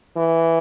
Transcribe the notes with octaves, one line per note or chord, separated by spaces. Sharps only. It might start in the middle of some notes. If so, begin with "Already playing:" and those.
E3